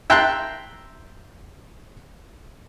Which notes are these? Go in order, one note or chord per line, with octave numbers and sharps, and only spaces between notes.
E5 G5 A5 A#5 C6 F#6